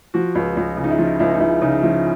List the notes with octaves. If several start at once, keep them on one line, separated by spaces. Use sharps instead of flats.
F3 F#4
C#2
C#2
C#3
D#4
E4
F3 F4
C#2 E4
D#4
C#2 E4
C#3 D#4
F3 E4